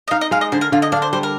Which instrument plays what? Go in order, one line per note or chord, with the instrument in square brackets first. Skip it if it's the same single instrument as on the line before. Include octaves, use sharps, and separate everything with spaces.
[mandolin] D#5
[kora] D#4 [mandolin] F5
[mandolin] D#5
[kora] G#3 [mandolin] F5
[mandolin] D#5
[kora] D3 [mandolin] C5
[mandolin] A#4
[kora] D3 [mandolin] F4
[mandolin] D#5
[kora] D4 [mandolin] F5
[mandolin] C5
[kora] G3 [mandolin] C5
[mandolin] A#4